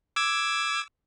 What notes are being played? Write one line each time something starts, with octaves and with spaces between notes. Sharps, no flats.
D6 E6 G#6